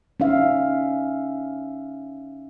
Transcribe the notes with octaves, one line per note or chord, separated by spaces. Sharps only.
C#4 D#4 E5 F5